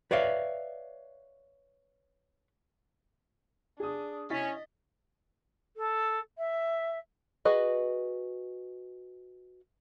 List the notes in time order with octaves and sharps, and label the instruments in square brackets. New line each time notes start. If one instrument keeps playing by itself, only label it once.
[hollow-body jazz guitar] B4 C#5 D5 E5 F5
[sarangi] D4 [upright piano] G#4 D#6
[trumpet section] C#4 [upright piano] E4 A6 B6 [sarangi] D#5
[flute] A4
E5
[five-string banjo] F#4 G#4 B4 D#5